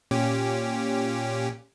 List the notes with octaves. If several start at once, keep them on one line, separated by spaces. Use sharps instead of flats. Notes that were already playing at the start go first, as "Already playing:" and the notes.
A#2 C#4 G4